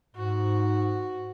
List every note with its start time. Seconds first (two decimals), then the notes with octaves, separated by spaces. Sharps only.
0.16 G#2 F#4